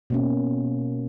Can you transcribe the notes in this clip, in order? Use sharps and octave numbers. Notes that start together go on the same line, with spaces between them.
B2 A#3 C#4